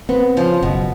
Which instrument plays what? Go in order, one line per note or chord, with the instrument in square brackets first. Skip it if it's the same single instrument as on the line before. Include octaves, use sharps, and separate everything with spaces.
[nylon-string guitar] B3 [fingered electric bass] C4
[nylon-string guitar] C#3 F3
[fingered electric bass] F#1 [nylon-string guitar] B2